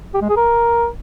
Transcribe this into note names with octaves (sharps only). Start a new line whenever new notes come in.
G4
G#3
G#4
A#4